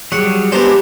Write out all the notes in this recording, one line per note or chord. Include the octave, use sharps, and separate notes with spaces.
F#3 G3 G#4 F#5
G#3 B3 D4 G4 C5 A#5